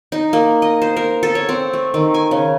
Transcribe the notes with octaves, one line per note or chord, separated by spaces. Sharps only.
D#4
A#3
D#5
C5
A#4
A4
C#5
C4
A3
D#3
G#5
C#3